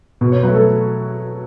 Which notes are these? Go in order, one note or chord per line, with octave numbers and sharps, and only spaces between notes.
B2
C#5
F#3 A3 B4
A4